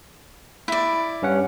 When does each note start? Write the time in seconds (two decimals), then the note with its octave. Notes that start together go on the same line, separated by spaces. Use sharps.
0.68 E4 D5
1.22 G2 C#4 F#5